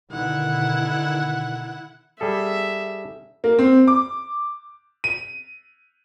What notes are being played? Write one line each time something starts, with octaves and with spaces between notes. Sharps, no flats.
B2 D3 D#3 E4 F#5
G3 G#4 A4 E5
A#3
C4
D6
D#7